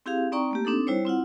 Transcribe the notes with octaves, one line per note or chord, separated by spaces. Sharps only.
C4 E4 G4 G#4 F5
C4 D#4 D5 G5 A#5 C#6
A3 A#3 G4
C4 D4 D#4 A4
G3 E4 C5 C#5
C4 E4 F4 F#5